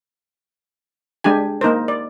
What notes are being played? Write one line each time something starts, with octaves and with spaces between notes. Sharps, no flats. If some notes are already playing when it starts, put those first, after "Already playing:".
G#3 D4 G4 G#5
A#3 D#4 A#4 C5
D5